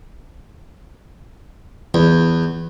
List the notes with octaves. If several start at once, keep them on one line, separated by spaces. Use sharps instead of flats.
E2